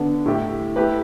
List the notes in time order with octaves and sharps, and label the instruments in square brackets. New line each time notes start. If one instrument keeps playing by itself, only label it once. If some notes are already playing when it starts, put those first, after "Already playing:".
Already playing: [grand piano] D3 B3 D4
A2 A3 E4 G4
A3 E4 G4 B4